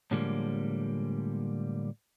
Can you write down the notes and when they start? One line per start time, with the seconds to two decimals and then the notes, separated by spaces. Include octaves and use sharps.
0.11 A2 D3 F3 G3 G#3 A#3